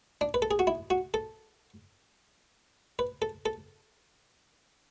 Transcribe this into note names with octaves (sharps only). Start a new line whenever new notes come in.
D4
B4
A4
G#4
F#4
E4
F#4
A4
B4
A4
A4